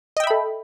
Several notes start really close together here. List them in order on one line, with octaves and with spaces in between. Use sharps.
D#5 G5 E5 B5 A4